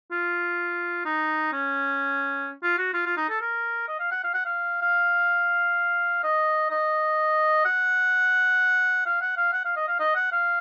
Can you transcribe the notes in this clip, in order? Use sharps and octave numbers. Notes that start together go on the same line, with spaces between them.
F4
D#4
C#4
F4
F#4
F4
F4
D#4
A4
A#4
D#5
F5
F#5
F5
F#5
F5
F5
D#5
D#5
F#5
F5
F#5
F5
F#5
F5
D#5
F5
D#5
F#5
F5